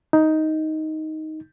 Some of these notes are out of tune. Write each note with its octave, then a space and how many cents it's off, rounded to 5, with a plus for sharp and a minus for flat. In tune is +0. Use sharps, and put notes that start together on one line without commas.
D#4 +10